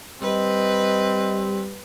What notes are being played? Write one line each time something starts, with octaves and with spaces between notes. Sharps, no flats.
G3 C4 B4 D#5